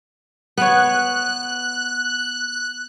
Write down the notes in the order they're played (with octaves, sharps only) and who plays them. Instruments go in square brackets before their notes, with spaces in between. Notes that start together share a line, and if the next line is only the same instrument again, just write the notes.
[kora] B3 C#5 [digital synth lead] F#6